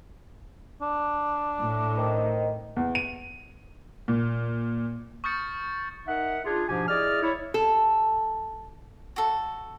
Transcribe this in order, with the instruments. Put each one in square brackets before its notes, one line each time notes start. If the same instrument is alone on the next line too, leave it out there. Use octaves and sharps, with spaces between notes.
[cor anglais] D4
[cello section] A2
[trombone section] D#3 C4 D#4
[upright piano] E2
D#7
A#2
[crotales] C#6 D#6 F6 G6 A6 C#7
[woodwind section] D#4 A#4 E5 F#5
D4 F4 G#4
G#2 B2 F3 D4 G4 G#5
E4 G#4 D5 D#5 F6
E4 C#5
[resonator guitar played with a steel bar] A4
[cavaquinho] F#4 A4